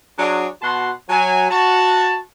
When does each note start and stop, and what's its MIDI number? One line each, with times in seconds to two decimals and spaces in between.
0.18 0.47 54
0.18 0.47 62
0.18 0.47 68
0.62 0.92 47
0.62 0.92 66
0.62 0.92 78
0.62 0.92 81
0.62 0.92 84
1.10 1.47 54
1.10 1.47 80
1.51 2.19 66
1.51 2.19 81